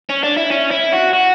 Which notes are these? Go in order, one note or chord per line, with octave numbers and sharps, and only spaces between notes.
C#4
D4
E4
C#4
E4
F#4
F#4